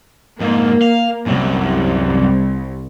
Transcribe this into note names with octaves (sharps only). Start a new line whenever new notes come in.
F2 G#2 A#3
F5
C2 F#2 C3